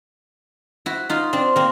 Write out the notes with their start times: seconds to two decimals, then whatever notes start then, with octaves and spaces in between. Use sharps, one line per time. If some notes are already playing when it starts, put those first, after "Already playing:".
0.86 E4 F#4
1.09 D#4 F4
1.33 C4 D4
1.56 A#3 C4